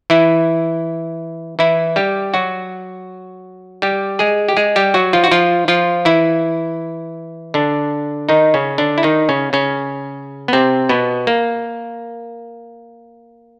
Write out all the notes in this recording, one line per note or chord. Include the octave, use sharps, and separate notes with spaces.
E3 E4
E3 E4
G3 G4
F#3 F#4
G3 G4
G#3 G#4
G4
G#3 G#4
G3 G4
F#3 F#4
F3 F4
F#4
F3 F4
F3 F4
E3 E4
D3 D4
D#3 D#4
C#3 C#4
D3 D4
E4
D#3 D#4
C#3 C#4
C#3 C#4
B3
C3 C4
B2 B3
A#3